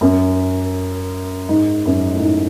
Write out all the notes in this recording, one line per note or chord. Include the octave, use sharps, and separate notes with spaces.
F#2
G#2
F#2
A2
G#2